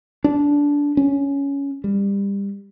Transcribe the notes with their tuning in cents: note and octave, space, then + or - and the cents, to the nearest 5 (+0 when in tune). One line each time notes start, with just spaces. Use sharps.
D4 -20
C#4 +10
G3 +25